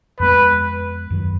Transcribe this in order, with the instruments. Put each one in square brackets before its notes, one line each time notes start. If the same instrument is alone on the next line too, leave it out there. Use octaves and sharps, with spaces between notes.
[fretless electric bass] F2 F3 G#3 B3 [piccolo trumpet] B4
[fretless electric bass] F#2 D#3 F#3